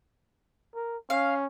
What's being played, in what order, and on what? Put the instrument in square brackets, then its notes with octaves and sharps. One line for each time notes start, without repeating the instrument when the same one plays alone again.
[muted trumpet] A#4
[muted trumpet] C#4 [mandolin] F5